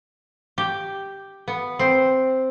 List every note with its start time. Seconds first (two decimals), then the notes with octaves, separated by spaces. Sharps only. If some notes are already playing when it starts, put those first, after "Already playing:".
0.58 G4
1.48 B3
1.79 C4